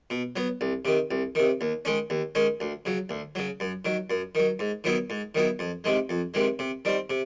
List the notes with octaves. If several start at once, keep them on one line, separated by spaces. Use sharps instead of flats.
B2
F#3 B3
C2
C3 D#3
C2
C3 D#3
D#2
D#3 G#3 C#4
D#2
D#3 G#3 C#4
D2
C#3 F#3
D2
C#3 F#3
F#2
D#3 F#3
F#2
D#3 F#3
G#2
D#3 F#3 B3 E4
G#2
D#3 F#3 B3 E4
F2
C3 D#3 G#3
F2
C3 D#3 G#3
C3
D#3 G3 C4
C3